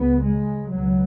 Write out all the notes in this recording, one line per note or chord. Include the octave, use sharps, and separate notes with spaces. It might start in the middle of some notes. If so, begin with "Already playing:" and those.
Already playing: C#2 C#3 B3
G#3
C#2 B2 F#3